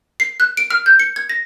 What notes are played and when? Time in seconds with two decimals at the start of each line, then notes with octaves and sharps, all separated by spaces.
0.20 C7
0.40 F#6
0.57 D7
0.70 F6
0.86 G6
1.00 C#7
1.16 G#6
1.29 A#6